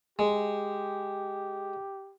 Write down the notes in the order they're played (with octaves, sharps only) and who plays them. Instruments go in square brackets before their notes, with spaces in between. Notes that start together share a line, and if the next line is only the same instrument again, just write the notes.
[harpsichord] G#3 [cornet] G4